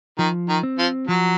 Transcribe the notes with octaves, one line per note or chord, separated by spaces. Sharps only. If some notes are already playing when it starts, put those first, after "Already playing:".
D#3 F3
D#3
C4
F3
F3 F#3